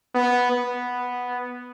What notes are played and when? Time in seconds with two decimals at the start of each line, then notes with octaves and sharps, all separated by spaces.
0.15 B3
0.51 B3